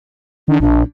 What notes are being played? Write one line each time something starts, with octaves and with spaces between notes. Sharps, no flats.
D#3 D4
A#1 D4